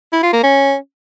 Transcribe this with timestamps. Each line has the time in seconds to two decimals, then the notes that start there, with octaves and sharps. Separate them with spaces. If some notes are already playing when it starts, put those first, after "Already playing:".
0.13 E4
0.23 F4
0.33 A#3
0.43 C#4